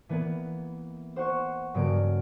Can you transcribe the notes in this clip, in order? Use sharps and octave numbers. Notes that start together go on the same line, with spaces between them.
E3 A#3 B3
C5 F#5 C#6
G2 C#3 F#3 A#3 D7